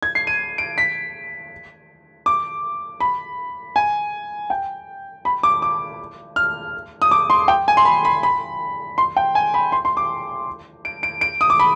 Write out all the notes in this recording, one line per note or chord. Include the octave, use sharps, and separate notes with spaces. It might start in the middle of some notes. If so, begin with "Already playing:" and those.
G#6
C7
D#7
D7
B6
D6
B5
G#5
G5
B5
D6
D6
F6
D#6
D6
C6
G5
G#5
C6
B5
B5
B5
C6
G5
G#5
B5
C6
C6
D6
D7
D7
D7
D#6
D6
B5